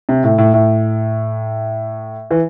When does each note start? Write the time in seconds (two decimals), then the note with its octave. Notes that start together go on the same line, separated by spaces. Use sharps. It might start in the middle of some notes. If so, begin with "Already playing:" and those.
0.09 C3
0.24 A2
0.38 A2
0.54 A2
2.31 E3